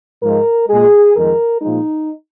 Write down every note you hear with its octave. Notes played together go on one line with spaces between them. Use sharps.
G#2 F3 G#3 A#4
A#2 G#3 G#4
F2 D#3 G#3 A#4
A#2 F3 G#3 D#4